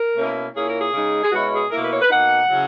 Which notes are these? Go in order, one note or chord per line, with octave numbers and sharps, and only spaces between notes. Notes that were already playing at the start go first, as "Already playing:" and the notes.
Already playing: A#4
B2 A#3 C#4 E4
A#2 A#3 C#4 E4 G#4
A#4
G#4
C#3 G#3 D#4
G#4
B2 G#3 C#4 E4 F#4
G#4
B2 A#3 E4 A#4
B4
C#5
B4
B2 A#3 D#4 F#5
C#3 F#3 C#4 E4